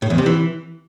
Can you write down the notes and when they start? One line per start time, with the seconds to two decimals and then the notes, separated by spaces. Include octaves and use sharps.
0.02 A2
0.10 E2
0.18 C3
0.26 E3